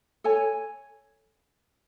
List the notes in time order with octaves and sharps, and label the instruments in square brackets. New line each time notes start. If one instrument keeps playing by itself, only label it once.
[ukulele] A4 C#5 G#5